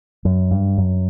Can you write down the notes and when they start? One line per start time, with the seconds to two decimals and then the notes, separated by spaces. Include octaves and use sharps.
0.25 F#2
0.51 G2
0.77 F#2